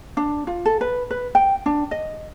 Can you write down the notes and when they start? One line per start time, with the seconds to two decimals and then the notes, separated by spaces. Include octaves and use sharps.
0.17 D4
0.47 F4
0.65 A4
0.81 B4
1.11 B4
1.35 G5
1.66 D4
1.91 D#5